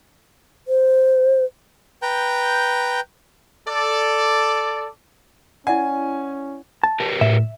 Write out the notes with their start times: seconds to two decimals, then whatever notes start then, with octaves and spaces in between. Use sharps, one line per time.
0.68 C5
2.02 B4 G5 A#5 G6
3.68 A4 D5
5.67 C#4 E4 D5 F#5 G#5
6.83 A5
7.00 G4 A#4 B4
7.21 A2 E5